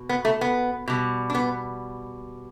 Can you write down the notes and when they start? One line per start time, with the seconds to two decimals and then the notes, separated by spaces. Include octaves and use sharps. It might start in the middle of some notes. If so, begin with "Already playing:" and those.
Already playing: B2
0.09 B3
0.25 A3
0.41 B3
0.88 B2 G3
1.30 D4
1.35 B3